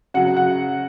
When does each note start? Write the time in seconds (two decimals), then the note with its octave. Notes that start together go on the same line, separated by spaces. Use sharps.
0.14 C#3 F#3 F#4 F#5
0.36 F#4 F#5